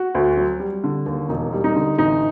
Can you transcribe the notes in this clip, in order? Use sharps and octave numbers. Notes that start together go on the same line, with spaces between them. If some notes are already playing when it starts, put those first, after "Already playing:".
Already playing: F#4
D2
F#3
G3
D3
D#2
E1 D#4
G3
D#4
D3
A1 D#4